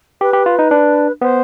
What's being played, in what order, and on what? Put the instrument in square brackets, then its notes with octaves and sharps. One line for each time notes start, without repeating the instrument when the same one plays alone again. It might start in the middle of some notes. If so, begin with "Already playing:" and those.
[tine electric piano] G4 [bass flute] B4
[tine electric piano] G4
F4
D#4
D4
[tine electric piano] B3 [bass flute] C5